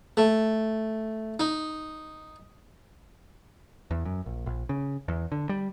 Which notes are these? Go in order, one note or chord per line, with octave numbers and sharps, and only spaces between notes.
A3
D#4
E2
F#2
A#1
A#1
C#3
E2
D3
G3